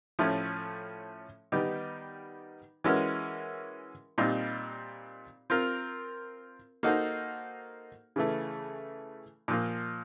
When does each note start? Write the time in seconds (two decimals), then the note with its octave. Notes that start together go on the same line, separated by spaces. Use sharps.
0.19 A2 F3 A3 C#4
1.52 D#3 G3 B3 D#4 G4
2.84 E3 G#3 C#4 F#4 A#4
4.18 A#2 G3 C4 D#4
5.50 C4 F4 A#4
6.83 A#3 D#4 F#4 A4 C5
8.16 C#3 E3 A3
9.48 A#2 F3 A#3